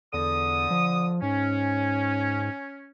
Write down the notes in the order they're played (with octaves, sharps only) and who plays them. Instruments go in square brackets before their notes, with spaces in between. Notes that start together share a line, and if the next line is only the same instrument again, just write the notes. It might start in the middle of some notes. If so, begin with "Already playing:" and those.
[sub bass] E2 [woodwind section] D3 D#6
[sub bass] F3
[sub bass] G#2 [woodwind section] C#4